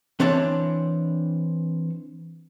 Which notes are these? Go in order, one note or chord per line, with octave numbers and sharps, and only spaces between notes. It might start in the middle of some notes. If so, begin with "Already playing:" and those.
E3 C4 D4 C#5 E5 A5